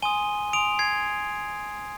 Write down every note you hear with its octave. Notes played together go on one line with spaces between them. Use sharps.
G#5 C6 D#6 D#7 G7
G#5 C6 D#6 D7 F7
G#6 C7